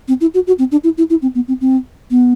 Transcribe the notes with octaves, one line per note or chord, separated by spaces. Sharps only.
C4
E4
F#4
F#4
C4
D4
E4
E4
E4
C4
B3
C4
C4
B3